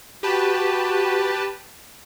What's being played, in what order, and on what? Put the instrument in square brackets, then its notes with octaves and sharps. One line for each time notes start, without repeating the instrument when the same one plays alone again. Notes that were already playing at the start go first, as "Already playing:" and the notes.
[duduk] F#4 [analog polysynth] G4 B4 A5